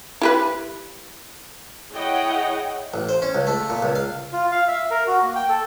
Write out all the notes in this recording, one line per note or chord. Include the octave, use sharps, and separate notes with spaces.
E4 G4 B4
E4 G#4 C#5 D#5 F#5 G5
A1
C5
C#4
C#2
A3
A#2
C#2
F5
F4
F5
E5
A#4
F#4
A#3
G5
A4